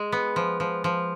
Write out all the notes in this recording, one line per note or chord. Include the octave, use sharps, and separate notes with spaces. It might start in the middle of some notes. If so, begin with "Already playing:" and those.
Already playing: G#3
B3
F3
F3
F3